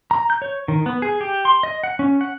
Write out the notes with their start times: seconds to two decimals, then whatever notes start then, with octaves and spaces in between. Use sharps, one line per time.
0.11 A#5
0.30 G6
0.42 C#5
0.68 D#3
0.86 B3
1.02 G#4
1.21 G4
1.45 C6
1.63 D#5
1.84 F#5
1.99 C#4
2.21 F#5